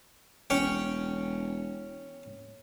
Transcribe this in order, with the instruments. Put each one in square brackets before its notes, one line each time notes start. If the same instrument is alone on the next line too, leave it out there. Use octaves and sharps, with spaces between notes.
[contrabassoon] E1 [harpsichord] C#4 C#5 G5